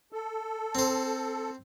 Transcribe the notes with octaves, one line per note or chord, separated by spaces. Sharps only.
A4
C4 C5